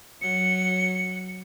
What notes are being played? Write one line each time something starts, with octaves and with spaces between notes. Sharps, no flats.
F#3 C#7